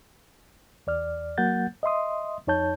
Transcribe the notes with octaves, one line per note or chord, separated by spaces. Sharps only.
E2 D5 F6
F#3 A#3 F#5 G6 A6
D#5 E5 C6 D#6
F2 D#4 C#5 A5 G6